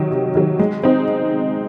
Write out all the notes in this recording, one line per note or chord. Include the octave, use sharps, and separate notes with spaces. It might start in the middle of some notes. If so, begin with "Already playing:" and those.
Already playing: C3 D#3 F#3
C3
D#3 F#3
G#3
C4 D#4